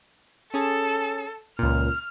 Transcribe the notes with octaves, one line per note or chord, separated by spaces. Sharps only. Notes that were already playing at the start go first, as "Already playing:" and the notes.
C#4 G#4 A4 A5
C#2 A#2 F6